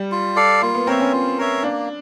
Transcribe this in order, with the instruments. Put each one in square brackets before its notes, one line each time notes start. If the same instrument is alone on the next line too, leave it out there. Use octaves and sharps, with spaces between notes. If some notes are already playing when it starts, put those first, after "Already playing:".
Already playing: [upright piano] G3
[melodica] F4
A4 D5 F5
[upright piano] A#3 [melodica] F4
[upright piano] B3
[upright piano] C4 [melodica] A#4 C#5 E5
[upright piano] C#4
[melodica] F4
A#4 C#5 E5
[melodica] A#3 [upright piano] D4